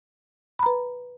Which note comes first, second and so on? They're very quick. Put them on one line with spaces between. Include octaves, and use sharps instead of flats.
B5 A#5 B4